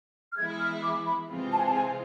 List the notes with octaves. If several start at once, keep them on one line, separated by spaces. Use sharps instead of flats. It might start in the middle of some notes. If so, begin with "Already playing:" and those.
F6
E3 G#3 B3 E4 G#6
F6
D6
B5
C3 E3 G#3 C4 F4
A5
G#5
A5
G#5